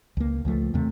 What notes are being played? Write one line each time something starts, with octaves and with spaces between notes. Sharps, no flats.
C#2 A#3
C#2 F3 A3
D#2 C3 A3